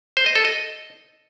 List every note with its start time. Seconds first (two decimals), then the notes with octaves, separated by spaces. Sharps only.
0.17 C5
0.26 D#5
0.35 A4
0.45 D#5